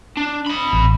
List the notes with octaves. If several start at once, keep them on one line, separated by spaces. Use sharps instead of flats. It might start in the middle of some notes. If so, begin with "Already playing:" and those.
D4
D#5 B5
A1